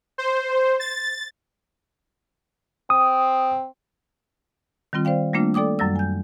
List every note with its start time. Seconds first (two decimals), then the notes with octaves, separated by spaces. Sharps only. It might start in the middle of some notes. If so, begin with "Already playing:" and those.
0.18 C5
0.80 A6
2.90 C4 D#6
4.93 D#3 G3 C4 F4
5.05 C5 D5 F5 G5
5.34 G3 A3 A#3 D4 F4
5.54 A4 D5 G5 D6 D#6
5.79 F#2 F#3 G3 E6
5.96 G#5 G6